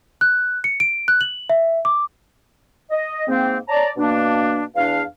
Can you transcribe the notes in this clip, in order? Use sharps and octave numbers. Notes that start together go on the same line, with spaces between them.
F#6
C#7
D7
F#6
F#7
E5
D6
D#5
G#2 A#3 C4
C#5 D5 A5 A#5
B2 A#3 D4
E2 D4 F5